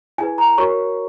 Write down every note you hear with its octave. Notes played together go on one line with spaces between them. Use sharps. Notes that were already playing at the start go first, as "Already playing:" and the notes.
E4 G#4 B4 G#5
A#5
F#4 A#4 C#5 C#6